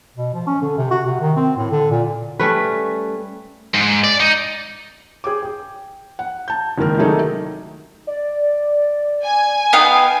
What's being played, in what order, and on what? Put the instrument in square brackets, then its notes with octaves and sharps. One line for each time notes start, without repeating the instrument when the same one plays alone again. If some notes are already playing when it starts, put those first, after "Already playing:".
[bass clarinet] B2
F3
C#4
D3
C3
F#4
C3
D#3
C4
A2
D3
A#2
[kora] G3 A3 C#4 B4
[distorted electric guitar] G#2
D5
D#4
[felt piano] G#4 G5 D6
G5
F#5
A5 G6
F#1 D#3 G#3 A#4 F6
C3 D#3 F#3 A3 D#4 G#4
[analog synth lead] D5
[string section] G#5
[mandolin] B3 D#4 F5 [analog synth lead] G5